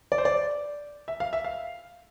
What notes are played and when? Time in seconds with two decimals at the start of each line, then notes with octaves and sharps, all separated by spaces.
0.12 D5
0.18 C5
0.25 D5
1.08 E5
1.20 F5
1.33 E5
1.45 F5